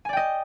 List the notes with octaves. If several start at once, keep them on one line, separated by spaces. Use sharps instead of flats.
D5 D#5 G5 G#5